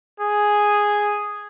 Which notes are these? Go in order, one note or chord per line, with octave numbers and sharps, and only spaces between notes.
G#4